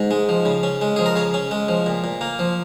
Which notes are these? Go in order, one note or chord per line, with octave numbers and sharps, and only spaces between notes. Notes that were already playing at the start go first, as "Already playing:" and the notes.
Already playing: G#2
G#3
F3
C#3
C#4
G#3
F3 G#4
A#4
C#3 C#5
C#4
G#3
F3
A#2
A#2
A#3
F3